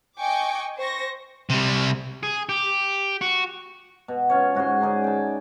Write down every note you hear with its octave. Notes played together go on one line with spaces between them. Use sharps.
D#5 G5 G#5 C#6 D6
C5 C#6 A#6
C3 G3
G#4
G4
F#4
B2
C#4 F4 C#5
G#2 F#4 G#4 C6
C#4 D#4 G#4 D5
G5 A5